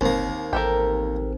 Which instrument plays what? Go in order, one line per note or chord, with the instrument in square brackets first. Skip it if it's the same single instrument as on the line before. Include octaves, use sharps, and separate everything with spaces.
[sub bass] G1 [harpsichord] D#2 A#3 [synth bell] C4 D#4 C5
[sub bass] A1 [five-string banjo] G4 A4 A#4